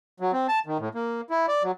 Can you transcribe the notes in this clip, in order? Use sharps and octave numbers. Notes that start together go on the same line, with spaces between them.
F#3
C4
A5
D#3
A2
A#3
E4
D5
F#3